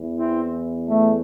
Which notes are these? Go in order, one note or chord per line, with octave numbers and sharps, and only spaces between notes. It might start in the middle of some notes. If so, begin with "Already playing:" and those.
Already playing: E2 E3
C4 E4
A3